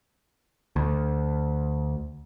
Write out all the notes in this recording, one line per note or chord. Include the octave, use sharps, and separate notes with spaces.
D2